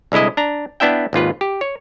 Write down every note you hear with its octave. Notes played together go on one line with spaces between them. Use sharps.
C2 D3 G#3 E4 D#5
D4 A#5
B3 D4 E4 E5 G5
G#1 D#2 F4 B4
G4
C#5